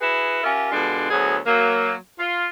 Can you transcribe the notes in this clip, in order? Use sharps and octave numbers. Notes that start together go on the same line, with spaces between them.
E4 F#4 G#4 B4
C#4 F4 G4 A#4 E5
B2 D3 G#3 D4 F4
D2 F#3 B3 G#4
F#3 A#3
F4